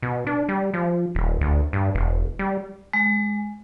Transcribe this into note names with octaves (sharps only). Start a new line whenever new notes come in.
B2
D4
G3
F3
D#1
D2
G2
E1
G3
G#3